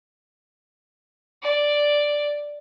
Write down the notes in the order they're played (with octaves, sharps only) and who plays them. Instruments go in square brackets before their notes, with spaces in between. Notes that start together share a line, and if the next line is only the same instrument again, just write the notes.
[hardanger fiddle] D5